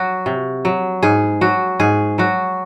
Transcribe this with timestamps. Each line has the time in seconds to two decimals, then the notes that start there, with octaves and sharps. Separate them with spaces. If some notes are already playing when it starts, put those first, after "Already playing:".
Already playing: F#3 F#4
0.26 C3
0.65 F#3
1.03 G#2 G#4
1.41 F#3 F#4
1.79 G#2 G#4
2.18 F#3 F#4